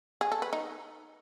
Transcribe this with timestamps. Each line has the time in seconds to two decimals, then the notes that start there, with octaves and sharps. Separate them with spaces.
0.21 G#4
0.32 A4
0.42 B4
0.53 D#4